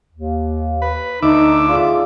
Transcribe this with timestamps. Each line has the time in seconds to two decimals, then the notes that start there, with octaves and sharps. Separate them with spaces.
0.13 D#2
0.82 B4
1.22 D2 D#4 E5 D6
1.68 F4 G#4 D5